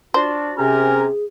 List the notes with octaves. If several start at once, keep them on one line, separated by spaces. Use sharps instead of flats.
D4 F4 F#4 C5
C3 C#4 G#4 A#4 G#5 A#5